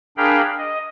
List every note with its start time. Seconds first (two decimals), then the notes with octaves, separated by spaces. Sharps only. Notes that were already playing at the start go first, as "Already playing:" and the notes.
0.17 D4 G#4 A#4 F5 G5 B5
0.58 D#5